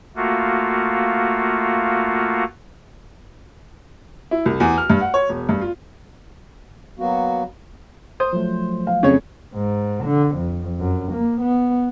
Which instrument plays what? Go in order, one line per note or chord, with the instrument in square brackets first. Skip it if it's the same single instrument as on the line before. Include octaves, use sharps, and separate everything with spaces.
[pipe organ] A3 A#3 F4 F#4
[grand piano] E4
C2
E2
F6
G2
F#5
C#5
E1
G2
F4
[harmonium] F#3 A#3 B3 F#4
[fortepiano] C5 [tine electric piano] D#6
[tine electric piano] F3 F#3 A3
[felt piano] F5
[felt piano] F2 [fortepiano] C#3 C#5
[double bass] G#2
D3
F2
F#2
A#3
B3